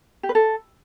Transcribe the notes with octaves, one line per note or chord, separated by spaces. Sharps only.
G4
B4
A4